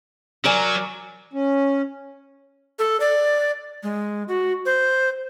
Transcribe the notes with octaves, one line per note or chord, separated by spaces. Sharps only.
F#3 A#4 D5 G#5
C#4
A4
D5
G#3
F#4
C5